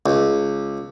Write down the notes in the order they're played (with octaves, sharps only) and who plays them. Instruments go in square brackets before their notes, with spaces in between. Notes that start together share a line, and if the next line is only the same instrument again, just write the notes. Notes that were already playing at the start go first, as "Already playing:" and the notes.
[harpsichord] C#2